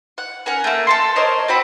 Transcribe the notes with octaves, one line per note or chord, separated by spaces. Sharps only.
F#5
C#4 A#4 F#5
A3 A#3
A4 A5 C6
A#4 C5 C#5 D#5
C4 F#4 B5